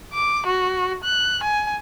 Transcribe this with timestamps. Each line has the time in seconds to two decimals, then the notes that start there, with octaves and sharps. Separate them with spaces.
0.12 D6
0.46 F#4
1.04 F#6
1.43 G#5